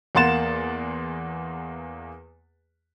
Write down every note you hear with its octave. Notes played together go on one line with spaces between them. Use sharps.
E2 A#3 F#5 C6 A6 E7